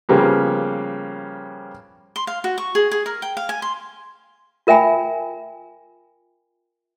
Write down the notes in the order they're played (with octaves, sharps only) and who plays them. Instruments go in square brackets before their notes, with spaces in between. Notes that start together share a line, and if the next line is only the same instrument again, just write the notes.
[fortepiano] C#3 F3 G3 A#3 B3
[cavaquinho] C6
F5
F#4
C#6
G#4
G#4
A#4
G5
F5
G#5
C6
[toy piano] F4 A#4 E5 G5 G#5 B5